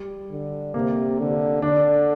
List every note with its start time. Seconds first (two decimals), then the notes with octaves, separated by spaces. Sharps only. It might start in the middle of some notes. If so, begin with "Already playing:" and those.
Already playing: G3
0.31 D3
0.74 C3 A#3
1.19 D3
1.62 D3 D4